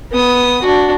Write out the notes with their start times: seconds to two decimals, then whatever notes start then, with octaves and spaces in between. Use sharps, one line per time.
0.12 B3 D#6
0.62 D4 F#4